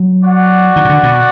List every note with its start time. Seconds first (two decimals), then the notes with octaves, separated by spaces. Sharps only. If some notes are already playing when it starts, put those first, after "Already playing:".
Already playing: F#3
0.22 F#4 D5 F#5
0.76 D#3
0.85 B2
0.90 D3
1.03 B2